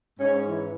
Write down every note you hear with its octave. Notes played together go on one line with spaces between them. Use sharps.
G#2 C#4
E3